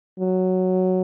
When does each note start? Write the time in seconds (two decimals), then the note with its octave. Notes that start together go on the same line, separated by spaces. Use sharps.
0.20 F#3